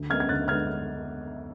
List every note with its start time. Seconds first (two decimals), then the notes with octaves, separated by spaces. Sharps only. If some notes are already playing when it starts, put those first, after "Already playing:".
Already playing: D2
0.10 D3 G#3 B3 F6 G#6
0.20 G#6
0.29 D2 F#6 A6
0.48 D3 G#3 B3 F6 G#6